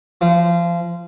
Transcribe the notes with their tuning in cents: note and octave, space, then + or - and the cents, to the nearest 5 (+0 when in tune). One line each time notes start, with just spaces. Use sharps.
F3 -25